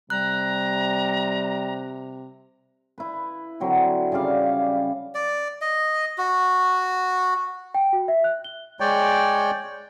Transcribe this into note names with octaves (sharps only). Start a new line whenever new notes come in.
C3 G3 A#5 F#6
E4 B4
D3 F#3 C4
C#3 G3 D5 F5
D5
D#5
F#4
G5
F#4
E5
F#6
G7
G#3 C#5 D5 G5